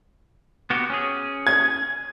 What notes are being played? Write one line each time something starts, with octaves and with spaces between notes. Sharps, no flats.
B3 F#4 G4
C#4 G#4
G#6